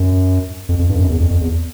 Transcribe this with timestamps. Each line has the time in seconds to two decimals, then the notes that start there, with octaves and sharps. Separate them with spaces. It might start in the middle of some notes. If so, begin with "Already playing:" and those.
Already playing: F#2
0.69 F2
0.79 F2
0.89 G2
0.94 F2
0.99 F#2
1.10 E2
1.20 F2
1.30 F2
1.41 E2